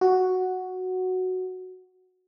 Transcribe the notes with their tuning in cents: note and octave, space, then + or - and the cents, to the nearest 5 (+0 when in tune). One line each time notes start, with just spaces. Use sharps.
F#4 +0